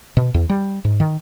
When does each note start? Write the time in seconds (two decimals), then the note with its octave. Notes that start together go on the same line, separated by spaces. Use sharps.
0.17 B2
0.34 E2
0.50 G3
0.85 G#2
1.00 D#3